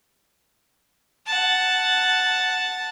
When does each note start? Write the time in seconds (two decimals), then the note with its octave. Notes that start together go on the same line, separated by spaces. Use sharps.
1.27 F#5 A5